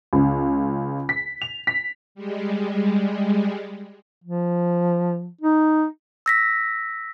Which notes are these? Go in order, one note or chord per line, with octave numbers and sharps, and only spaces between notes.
C#2
B6
F7
B6
G3 G#3
F3
D#4
E6 A#6 B6